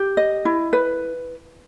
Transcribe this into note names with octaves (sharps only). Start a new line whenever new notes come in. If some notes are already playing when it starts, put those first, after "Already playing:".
Already playing: G4
D#5
E4
B4